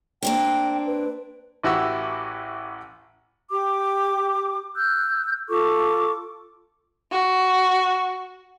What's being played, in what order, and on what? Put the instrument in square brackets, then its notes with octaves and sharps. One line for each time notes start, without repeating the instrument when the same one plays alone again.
[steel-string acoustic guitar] A#3 C4 D4 [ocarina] G5
[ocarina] B4
[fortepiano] A1 E3 E4 F#4 G4 E6
[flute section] G4 D6
E6 F#6 G6
F4 A4 C#6 D6
[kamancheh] F#4